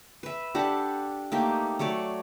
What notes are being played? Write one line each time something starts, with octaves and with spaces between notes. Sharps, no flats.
B4 E5
D4 G4 A4 F#5
A3 A#3 D#4 G4
F#3 A3 C#5 D5